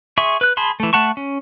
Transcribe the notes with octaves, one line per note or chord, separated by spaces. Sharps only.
G#4 E5 C6 C#6
B4 F#6
G#4 A5 B5 C6
E3 A3
A3 F#5 A5 C#6
C#4